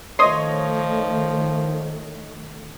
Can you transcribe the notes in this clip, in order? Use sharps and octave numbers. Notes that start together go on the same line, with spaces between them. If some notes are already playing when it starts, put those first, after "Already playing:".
D#3 F3 A3 C#5 D#5 C6 D#6